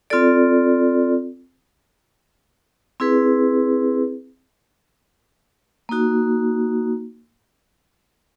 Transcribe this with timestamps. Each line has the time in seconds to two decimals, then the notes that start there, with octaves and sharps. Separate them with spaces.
0.10 C4 F4 A4 D5
3.00 C4 E4 G#4 B4
5.89 A#3 D#4 F#4